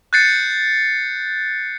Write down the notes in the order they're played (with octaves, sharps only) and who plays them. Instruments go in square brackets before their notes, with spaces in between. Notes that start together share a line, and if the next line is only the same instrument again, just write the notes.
[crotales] F#6 G6 A6 C7 C#7